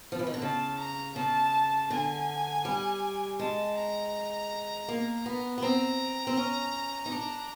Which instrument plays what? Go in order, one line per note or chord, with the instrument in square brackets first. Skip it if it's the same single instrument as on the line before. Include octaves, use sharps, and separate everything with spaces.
[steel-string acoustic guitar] F3
E3
D#3
D3
[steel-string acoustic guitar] C#3 [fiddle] A5
[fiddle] A#5
[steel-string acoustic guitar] C#3 [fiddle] A5
[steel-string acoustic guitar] D3 [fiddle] G#5
[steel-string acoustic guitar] G3
[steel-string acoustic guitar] G#3 [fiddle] A5
[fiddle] A#5
[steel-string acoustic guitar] A#3
B3
B3
[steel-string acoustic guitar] C4 [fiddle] A#5
[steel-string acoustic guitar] C4
C#4
D#4
D4